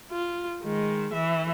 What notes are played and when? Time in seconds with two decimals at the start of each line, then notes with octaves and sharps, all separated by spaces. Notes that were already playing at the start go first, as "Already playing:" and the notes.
0.12 F4
0.63 D#3 G#3
1.14 E3 E5